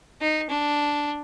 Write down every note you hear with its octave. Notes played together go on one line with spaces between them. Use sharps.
D#4
D4